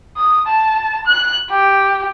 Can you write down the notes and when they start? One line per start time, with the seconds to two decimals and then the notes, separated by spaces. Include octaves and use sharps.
0.17 D#6
0.47 A5
1.07 F#6
1.50 G4